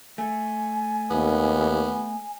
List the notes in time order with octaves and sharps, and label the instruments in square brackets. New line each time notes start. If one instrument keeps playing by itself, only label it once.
[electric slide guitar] A3 [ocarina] G#5
[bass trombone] D#2 [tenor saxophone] B3